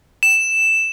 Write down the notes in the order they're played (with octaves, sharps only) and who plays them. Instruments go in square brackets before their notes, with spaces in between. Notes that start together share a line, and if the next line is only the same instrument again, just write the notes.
[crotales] E7